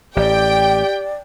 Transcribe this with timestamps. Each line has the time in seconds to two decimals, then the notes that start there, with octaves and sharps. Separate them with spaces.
0.16 A1 A2 G4 D5 G5